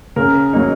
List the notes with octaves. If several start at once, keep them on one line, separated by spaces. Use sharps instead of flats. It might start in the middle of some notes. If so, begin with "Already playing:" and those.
C#3 A#4
F#3 A#3 D#4